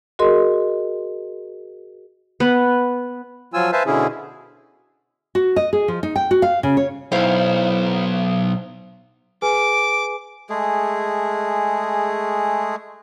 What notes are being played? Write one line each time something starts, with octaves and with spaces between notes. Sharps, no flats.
F#4 G#4 A#4 D#5 C6
B3
F3 F#3 F4 G#5 E6
B4 C5 E5 F5 G#5 A5
B2 D3 C#4 E4 G#4
F#4
D#5
G#4
F3
D#4
G5
F#4
F5
C#3
C#5
B1 E4 C5 F5
G#4 B4 G#5 D6
G#3 A3 G#4